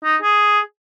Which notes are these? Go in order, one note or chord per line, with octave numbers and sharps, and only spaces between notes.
D#4
G#4